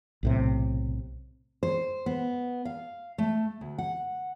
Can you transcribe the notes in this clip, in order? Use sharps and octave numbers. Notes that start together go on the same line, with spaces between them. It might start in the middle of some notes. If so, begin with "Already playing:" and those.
B1 A2 C3
C5
B3
F5
A3
D2
F#5